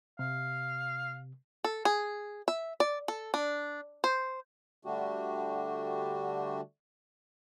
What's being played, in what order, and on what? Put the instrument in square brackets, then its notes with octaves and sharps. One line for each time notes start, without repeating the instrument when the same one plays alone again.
[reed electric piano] C3 [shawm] F5
[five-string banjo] A4
G#4
E5
D5
A4
D4
C5
[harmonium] D3 G3 A3 D4 F#4 G4